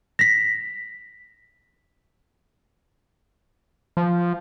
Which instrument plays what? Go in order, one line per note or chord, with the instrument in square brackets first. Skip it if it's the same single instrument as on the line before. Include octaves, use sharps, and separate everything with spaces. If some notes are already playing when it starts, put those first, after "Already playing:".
[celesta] A#6 B6
[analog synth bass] F3